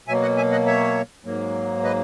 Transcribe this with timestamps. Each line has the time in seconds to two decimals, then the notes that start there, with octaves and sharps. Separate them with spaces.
0.08 B2 F#3 A#3 E5 G#5
0.22 D#5 F#5
0.37 E5 G#5
0.52 D#5 F#5
0.67 C#5 E5
1.25 G#2 F#3 A#3
1.84 B4 D#5